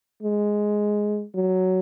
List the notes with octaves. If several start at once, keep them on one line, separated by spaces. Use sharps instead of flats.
G#3
F#3